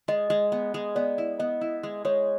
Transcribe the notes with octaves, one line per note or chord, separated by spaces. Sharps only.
G#3 D#5
G#3
B3
G#3
B3 D5
E4
B3 D#5
E4
G#3
G#3 C#5